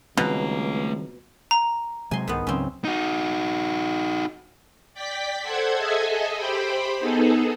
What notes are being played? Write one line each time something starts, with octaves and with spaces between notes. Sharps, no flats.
C#2 B2 D#3 G3 A3 C4 A#5
A#5
C3 F#3 G#3 G#5 C6
C2 G#2 D#3 B3
C#2 C#3 F#3 C4 C#4
D#4 F#4
D5 G5 B6
A4 C5 F#5 G#6
G#4 A4 D#5 E5 G#5
G4 C5 G5 B5
B3 D#4 G#4 A4